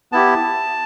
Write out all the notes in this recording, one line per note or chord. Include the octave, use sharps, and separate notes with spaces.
B3 E4 G4 A5